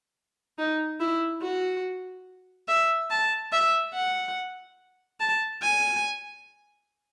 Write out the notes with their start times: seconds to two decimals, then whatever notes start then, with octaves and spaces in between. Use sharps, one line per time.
0.58 D#4
1.00 E4
1.42 F#4
2.68 E5
3.10 A5
3.52 E5
3.95 F#5
5.20 A5
5.63 G#5